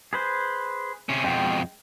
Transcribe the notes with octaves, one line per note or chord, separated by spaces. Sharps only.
G#4 B4 C5
C3 C#4
F2 B2 G#3 G5